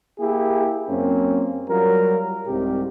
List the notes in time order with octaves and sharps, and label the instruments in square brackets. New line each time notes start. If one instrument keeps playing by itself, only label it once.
[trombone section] A#3 E4 G4 G#4
F#2 A#3 C4 C#4
F#3 G3 F4 A#4
C2 G#2 C3 G4